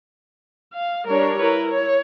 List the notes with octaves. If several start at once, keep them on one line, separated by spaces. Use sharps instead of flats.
F5
G3 D4 A#4 C#5
E4 A#4 B4
C#5